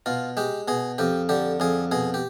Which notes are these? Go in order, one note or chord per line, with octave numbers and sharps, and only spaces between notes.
B2 F4
G#3 G4
B2 G#4
F2 G4
D3 G4
F2 G#4
B2 G#4
G4